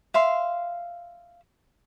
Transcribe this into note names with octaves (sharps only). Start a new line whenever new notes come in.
E5 F5 C6